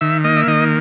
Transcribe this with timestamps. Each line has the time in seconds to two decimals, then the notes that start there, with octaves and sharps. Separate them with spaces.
0.01 D#3 E5
0.24 A#3 D#5
0.36 E5
0.47 D#3 D#5